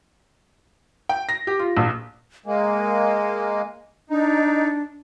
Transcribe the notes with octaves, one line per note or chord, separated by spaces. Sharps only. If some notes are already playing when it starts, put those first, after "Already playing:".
G5
A#6
G4
F4
A#1
G#3 A#3 G#5
D4 D#4